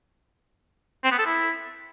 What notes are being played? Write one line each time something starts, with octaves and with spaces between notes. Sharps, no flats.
C4
B3
A4
E4